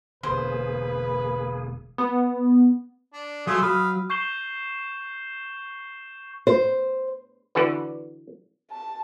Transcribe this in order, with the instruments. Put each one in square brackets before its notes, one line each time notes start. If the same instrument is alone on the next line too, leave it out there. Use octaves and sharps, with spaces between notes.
[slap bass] E1 D3 [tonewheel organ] A#3 G#4 [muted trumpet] B4 [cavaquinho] C5
[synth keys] B3
[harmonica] D4
[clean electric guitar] F#3 [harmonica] A3 F4 G#4
[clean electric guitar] F#3 [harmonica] F5 B5 D#6
[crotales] C#6 G6 C7 E7 G7
[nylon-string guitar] C5
[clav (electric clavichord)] D3 E3 F#4 B4
[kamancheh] A5